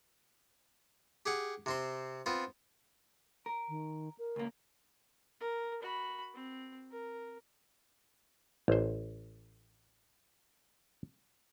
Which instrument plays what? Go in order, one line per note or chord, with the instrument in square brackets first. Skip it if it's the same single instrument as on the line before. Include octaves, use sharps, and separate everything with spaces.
[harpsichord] G4 G#4 F#5
C3 C4 C6
B3 C4 F4
[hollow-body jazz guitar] A#4
[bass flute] D#3
A#4
[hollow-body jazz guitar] C#2 A#3
[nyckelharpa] A#4
F#4 B5
C4
A#4
[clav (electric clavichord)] A1 C5